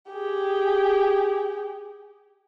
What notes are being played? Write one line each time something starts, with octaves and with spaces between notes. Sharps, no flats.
G4 G#4